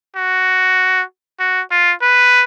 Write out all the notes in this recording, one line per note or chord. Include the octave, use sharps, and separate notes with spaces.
F#4
F#4
F4
B4